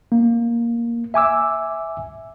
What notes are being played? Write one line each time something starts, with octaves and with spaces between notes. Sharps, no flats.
A#3
E5 G#5 D6 E6